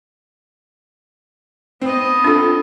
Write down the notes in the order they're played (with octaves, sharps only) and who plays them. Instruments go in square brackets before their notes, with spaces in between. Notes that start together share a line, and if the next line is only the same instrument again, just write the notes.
[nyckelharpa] B3 D#5 [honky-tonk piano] C4
[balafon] D4 F4 A4